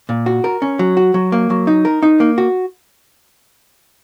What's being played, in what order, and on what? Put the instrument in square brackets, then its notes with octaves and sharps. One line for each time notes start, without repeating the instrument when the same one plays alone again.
[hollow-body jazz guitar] A#2
F#4
A#4
C#4
F#3
F#4
F#3
A#3
F#3
D#4
A#4
D#4
A#3
F#4